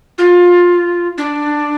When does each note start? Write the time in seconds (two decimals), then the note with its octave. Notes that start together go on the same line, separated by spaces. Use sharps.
0.18 F4
1.18 D4